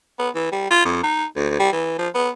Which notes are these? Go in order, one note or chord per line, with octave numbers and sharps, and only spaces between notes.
B3
E3
G3
F4
F2
D#4
D2
G3
E3
F3
B3